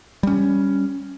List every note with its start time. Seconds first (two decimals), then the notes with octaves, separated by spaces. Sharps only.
0.23 G3 C#4